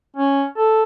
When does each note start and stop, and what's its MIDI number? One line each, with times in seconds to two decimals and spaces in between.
0.16 0.44 61
0.57 0.83 69